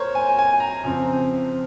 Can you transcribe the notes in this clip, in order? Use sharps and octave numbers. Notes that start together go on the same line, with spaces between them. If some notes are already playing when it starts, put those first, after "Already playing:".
Already playing: A#3 A#4 C5 C#5
G#5
G#5
A#5
F2 C#3 F3 C4